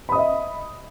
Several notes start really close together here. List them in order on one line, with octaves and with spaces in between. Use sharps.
B5 D#6 D#5 E5